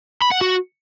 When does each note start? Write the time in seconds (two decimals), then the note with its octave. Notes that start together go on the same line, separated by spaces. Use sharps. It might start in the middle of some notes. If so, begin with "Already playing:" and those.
0.22 B5
0.31 F#5
0.41 F#4